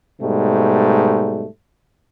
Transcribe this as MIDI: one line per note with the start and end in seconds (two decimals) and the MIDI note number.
0.21 1.46 44
0.21 1.46 47
0.21 1.46 55
0.21 1.46 57